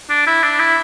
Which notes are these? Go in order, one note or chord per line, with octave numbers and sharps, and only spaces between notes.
D4
E4
D4
E4